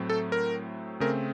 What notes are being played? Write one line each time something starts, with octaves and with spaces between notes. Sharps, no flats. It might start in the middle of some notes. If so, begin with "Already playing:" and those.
Already playing: A2 F#3 A3 C4
A4
A#4
C#3 A3 C4 A#4